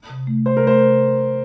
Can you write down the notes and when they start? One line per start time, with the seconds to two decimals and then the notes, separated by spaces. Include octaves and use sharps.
0.10 C3
0.27 A3
0.45 C3 C5
0.57 A#4
0.64 A3 C5
0.82 C3